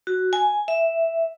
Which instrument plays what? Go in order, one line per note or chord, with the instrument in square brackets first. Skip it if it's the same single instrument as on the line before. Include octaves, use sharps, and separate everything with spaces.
[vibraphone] F#4
G#5
E5